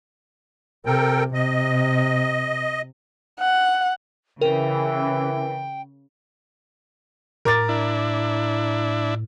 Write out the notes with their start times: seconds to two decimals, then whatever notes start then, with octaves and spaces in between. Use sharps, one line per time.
0.86 C3 A4 A#4 G5
1.34 C3 D#5
3.40 F#5
4.41 C#3 E3 A#4 G5
7.45 A2 A#4 D6 A6
7.69 D4 E4